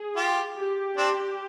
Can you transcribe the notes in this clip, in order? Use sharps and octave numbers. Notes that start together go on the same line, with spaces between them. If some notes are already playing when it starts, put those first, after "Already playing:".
Already playing: G#4
F4 G4
G4
C4 D4